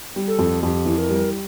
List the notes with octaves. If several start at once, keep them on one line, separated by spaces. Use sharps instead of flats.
G3
A4
F2
F2 G4
E3
A#4
G3